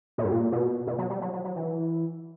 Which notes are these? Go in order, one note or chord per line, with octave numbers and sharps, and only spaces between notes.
A#2
G2
A#2
B2
B2
F#3
G3
F#3
F#3
F#3
E3